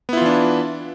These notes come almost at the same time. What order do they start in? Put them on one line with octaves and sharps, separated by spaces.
B3 E4 F4 E3 D4